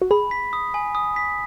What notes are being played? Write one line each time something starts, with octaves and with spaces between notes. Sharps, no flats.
F#4
G#4 B5
B6
D#6
G#5
D#6
B6